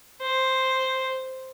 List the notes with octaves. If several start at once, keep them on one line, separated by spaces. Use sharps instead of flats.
C5